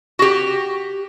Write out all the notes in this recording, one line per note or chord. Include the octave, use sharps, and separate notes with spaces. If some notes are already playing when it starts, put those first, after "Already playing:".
F#4 G4